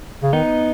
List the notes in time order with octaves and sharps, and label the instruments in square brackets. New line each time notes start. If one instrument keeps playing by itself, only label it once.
[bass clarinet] C#3
[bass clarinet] D#3 [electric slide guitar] B3 D#4